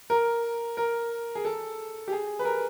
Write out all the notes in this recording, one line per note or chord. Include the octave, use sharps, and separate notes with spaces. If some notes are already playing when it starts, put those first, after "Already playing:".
A#4
A#4
G#4
A4
G4
G#4
B4
A#4